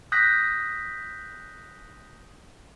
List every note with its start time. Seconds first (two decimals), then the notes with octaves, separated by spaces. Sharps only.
0.12 D#6 F#6 G6 A#6 B6